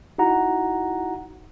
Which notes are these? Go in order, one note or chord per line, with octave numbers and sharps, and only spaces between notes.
D#4 E4 F#4 F#5 A#5